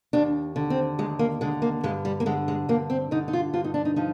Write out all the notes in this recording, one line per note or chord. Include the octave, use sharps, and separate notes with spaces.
D#2 D4
D3
C4
D#2 G#3
A#3
D3 G#3
A#3
G2 G#3
G3
A#3
D3 G#3
G#3
G2 A#3
C4
D3 D#4
D#4
F4
G2 F4
D#4
D4
D#4
F3 D#4